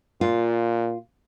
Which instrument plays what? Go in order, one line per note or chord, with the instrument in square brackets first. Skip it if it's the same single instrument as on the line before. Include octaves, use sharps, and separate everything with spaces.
[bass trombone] A#2 [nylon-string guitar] F4